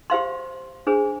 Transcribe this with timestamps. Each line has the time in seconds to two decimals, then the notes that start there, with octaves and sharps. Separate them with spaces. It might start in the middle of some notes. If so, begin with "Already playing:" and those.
0.10 G4 C5 F5 C6
0.87 D4 G#4 C5